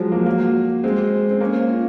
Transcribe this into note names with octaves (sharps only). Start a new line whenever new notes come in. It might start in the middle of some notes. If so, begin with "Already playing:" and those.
Already playing: F3 F#3 G#3
F#3 A#3
F#3 A#3
G#3 C4
C4
A#3 C#4
C#4 F4